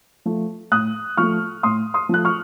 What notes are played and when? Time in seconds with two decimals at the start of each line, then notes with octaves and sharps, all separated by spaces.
0.25 F3 A3
0.71 A2 D#6 F#6
1.17 F3 A3 C#6 F6
1.63 A2 C6 D#6
1.94 C6 D#6
2.09 F3 A3 F#6
2.25 C#6 F6